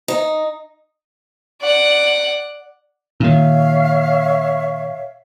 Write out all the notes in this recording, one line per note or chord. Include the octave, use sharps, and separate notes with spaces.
D#4
D5 F#5
A#2 D#3 C#5 E5 F5